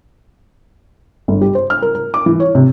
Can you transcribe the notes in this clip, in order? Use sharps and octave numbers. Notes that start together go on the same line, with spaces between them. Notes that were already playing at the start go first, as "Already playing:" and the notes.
G1
G4
C5
F6
A#4
A#4
D6
E3
C#5
C3